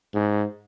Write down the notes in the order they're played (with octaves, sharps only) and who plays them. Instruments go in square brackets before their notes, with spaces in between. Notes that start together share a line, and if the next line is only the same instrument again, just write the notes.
[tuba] G#2